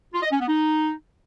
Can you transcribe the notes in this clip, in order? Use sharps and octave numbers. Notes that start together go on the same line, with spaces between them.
F4
D#5
C#4
B3
D#4